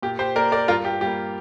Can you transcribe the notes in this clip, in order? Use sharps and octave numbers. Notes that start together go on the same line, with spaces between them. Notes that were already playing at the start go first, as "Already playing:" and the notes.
A#2 G4
G4 C5
A#3 A#4 D5
A#4 D5
G2 F4 A#4
G4
G3 A#3 G4